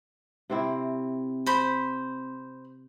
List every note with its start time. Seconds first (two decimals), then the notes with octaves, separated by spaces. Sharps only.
0.50 C3 C4 E4
1.46 C5 B5